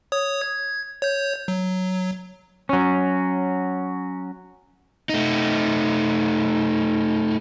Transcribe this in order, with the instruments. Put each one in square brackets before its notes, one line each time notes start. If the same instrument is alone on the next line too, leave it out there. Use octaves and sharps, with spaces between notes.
[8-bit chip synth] C#5 D#6
G#6
C#5 G6
F#3
[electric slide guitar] F#3 C#4
A3 D#4